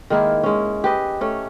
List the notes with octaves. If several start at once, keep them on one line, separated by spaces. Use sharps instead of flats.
D#3 G#3 A#3 E4
G#3 C#4
G4 B4 D#5
A3 C#4 C#5